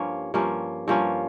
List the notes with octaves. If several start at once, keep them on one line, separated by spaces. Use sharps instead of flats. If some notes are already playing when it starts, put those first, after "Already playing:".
Already playing: G2 F3 A#3 C#4
G2 F3 A#3 C#4
G2 F3 A#3 C#4